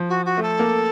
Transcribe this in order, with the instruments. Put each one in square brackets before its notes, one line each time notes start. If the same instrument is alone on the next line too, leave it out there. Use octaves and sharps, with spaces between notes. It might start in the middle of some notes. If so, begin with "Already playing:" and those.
Already playing: [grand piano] F3
[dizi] F#4
F#4
[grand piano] A3 [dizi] A4
[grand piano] A#3